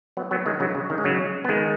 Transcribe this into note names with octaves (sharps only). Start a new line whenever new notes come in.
F#3 B3
F#3 B3
D#3 G#3
C#3 F#3
C#3
D#3
G#3
C#3 F#3
B3
D#3 G#3